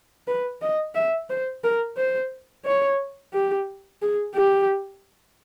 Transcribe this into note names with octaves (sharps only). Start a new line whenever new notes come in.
B4
D#5
E5
C5
A#4
C5
C#5
G4
G#4
G4